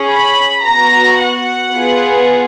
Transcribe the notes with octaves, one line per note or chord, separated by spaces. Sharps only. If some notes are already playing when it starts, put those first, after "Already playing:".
Already playing: C#4 G#4
B5
B3 F#4 A#5
F#5
B3 F4 G#4